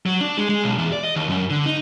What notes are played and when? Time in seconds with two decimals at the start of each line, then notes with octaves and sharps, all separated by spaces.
0.06 F#3
0.21 D4
0.37 G#3
0.49 G#3
0.64 B1
0.78 E2
0.93 D5
1.04 D#5
1.16 D#2
1.29 F#2
1.50 D3
1.66 D#4